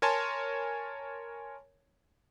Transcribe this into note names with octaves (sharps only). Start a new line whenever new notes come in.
A#4 C#5 G#5 A5 C6